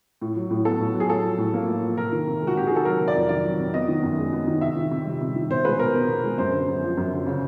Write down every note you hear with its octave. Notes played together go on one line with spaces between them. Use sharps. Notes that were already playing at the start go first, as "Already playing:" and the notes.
A2
F#3
A2
B3 A4
A2
F#3
G#4
A2 A4
F3
A2
A#3
A2
F3
C3 A#4
D#3
C3
G#3
F#4
C3 G4
D#3 G#4
A4
F#3 A#4
C3
D5
F2
D#3 D5
F#3
C3
B3 D#5
D#3
F#2
G#3
B3
D#3
C3 E5
D#3
C3
G3
C3
D#3
B2 C5
G#3 B4
B2 A#4
B3
B2
G#3
F#2 C5
D3
F#2
F3
F#2
D3
C#3